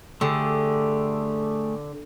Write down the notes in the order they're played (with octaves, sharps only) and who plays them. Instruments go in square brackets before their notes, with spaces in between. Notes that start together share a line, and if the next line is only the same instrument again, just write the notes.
[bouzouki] D3 [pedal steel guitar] A3 G4 G#4